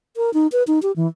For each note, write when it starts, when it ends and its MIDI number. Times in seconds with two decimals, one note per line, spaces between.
0.17 0.33 70
0.34 0.47 63
0.52 0.63 71
0.67 0.79 63
0.83 0.92 67
0.96 1.07 52